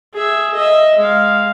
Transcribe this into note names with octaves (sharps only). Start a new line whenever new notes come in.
G#4 E5
D#5 E5
G#3 F5